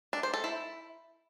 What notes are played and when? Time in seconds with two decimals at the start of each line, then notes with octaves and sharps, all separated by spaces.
0.13 D4
0.23 C5
0.34 A4
0.44 E4